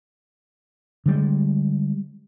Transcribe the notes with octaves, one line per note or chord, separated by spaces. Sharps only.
D3 G3 G#3